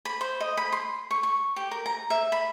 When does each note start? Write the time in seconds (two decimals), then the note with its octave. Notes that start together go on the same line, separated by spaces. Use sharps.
0.05 B5
0.21 C5
0.40 D#5
0.57 B5
0.72 C6
1.11 C#6
1.23 C#6
1.56 G4
1.71 A#4
1.86 A#5
2.10 E5
2.32 B5